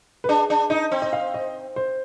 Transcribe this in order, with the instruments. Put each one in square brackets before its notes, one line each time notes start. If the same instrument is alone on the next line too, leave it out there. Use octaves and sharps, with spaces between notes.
[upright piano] B4
[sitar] D4 [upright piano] G#4
[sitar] D4
[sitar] D#4 [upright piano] D#5
[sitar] C4
[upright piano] D#5
F5
D#5
C5